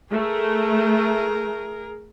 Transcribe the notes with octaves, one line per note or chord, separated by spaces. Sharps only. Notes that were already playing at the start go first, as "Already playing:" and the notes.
A3 G#4 A#4